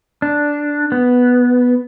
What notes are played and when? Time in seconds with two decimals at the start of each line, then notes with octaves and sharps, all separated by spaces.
0.22 D4
0.92 B3